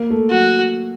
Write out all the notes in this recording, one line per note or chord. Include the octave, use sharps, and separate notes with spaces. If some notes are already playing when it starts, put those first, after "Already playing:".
Already playing: A#3
A3
F#3 F#4